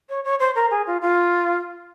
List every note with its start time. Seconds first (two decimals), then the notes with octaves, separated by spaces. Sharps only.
0.09 C#5
0.24 C#5
0.40 C5
0.55 A#4
0.71 G#4
0.87 F4
1.01 F4